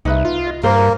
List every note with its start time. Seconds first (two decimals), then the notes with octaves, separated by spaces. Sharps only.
0.05 C2 D#4 B4 E5
0.25 F4
0.47 D#5
0.63 G2 A#3 A#4 C5